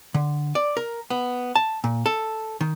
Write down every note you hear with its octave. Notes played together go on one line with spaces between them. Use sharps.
D3
D5
A#4
B3
A5
A#2
A4
D#3